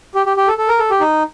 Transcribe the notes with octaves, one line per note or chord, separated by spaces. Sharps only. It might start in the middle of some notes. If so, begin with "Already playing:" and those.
G4
G4
G4
A4
A4
A#4
A4
G4
D#4